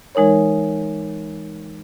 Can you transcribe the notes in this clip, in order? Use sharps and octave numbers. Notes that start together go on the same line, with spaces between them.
E3 G#3 D#4 A#4 C#5